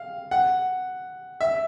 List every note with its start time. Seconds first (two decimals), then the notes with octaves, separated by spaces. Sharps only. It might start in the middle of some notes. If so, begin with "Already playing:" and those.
Already playing: F5
0.31 F#5
1.41 E5